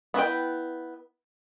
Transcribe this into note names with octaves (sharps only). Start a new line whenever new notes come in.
B3 E4 B4 G5